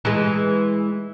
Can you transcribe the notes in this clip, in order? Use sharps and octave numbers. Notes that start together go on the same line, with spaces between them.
E3 G#3